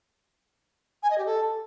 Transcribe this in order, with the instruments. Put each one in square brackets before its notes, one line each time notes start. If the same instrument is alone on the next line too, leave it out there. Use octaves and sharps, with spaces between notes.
[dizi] G#5
D#5
G4
A4